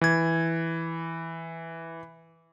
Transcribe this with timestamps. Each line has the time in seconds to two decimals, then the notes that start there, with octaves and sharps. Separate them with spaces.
0.01 E3 G#6